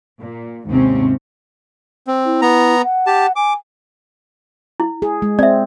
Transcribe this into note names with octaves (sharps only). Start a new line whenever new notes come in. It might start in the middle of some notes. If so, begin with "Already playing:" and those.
A#2
D#2 G#2 C3 G#3 C4 C#4
C4
E4
B3 A#5
F#5
G4 A5
G#5 D6
E4
G#4
G#3
C4 D5 E5